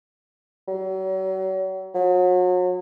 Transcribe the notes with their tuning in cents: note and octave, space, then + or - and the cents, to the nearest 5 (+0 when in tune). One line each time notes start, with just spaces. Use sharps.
F#3 +40
F#3 -35